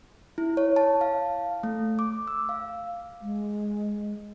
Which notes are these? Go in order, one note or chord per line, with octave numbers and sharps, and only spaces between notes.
E4
C#5
A5
F5
A3
D6
E6
F5
G#3